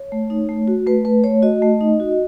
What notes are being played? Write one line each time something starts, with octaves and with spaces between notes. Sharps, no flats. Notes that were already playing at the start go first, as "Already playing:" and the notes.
Already playing: C#5
A3
D#4
A3
F#4
A3 B4
A3 B4
A3 C#5
F#4 D#5
A3
D#4
F#4